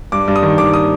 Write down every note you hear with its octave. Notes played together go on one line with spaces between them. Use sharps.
G2 D6
G2
D#6
D#3
D#3 D6
D#6